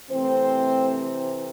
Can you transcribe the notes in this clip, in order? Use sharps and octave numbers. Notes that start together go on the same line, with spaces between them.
C3 E3 A3 C4 C5